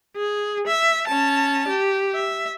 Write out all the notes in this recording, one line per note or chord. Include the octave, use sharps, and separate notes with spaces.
G#4
E5
C#4 A5
G4
E5